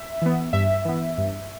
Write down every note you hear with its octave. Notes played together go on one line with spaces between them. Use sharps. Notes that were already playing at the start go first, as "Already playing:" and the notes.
Already playing: E5
E3 B3
G2 E5
E3 B3
G2